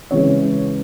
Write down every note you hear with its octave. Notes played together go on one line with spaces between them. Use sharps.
C#3 E3 G#3 C#5